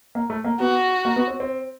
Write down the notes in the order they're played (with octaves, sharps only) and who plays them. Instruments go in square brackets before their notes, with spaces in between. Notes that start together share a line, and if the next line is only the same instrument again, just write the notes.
[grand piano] A#3
A3
A#3
[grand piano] B3 [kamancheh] F#4
[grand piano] A#3
B3
C4
C4